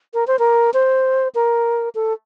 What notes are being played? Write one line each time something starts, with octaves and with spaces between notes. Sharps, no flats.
A#4
C5
A#4
C5
A#4
A4